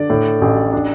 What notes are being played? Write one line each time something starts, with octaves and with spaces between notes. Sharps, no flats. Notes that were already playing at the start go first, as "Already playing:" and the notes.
Already playing: D3 D5
A2
A1
D4